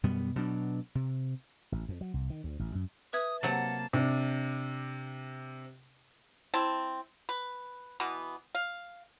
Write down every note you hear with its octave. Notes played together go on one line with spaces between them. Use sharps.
F#2 B2 G3 B3
B2 F#3 D4
C3
A1
F2
F#3
C2
D#3
D2
A1
F#2
B4 E5 D#6 G#6
C3 F#3 A#3 F#5 A5
C3 D4
C4 E4 A5
B4
B2 E3 B3
F5